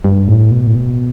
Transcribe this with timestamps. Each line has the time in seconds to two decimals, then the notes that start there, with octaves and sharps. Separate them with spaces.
0.04 G2
0.28 A2
0.51 B2
0.67 A2
0.75 B2